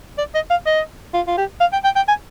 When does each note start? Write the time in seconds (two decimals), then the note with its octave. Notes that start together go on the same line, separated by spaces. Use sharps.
0.18 D5
0.35 D#5
0.50 F5
0.66 D#5
1.14 F4
1.27 F4
1.37 G4
1.60 F5
1.73 G5
1.84 G5
1.96 G5
2.08 G#5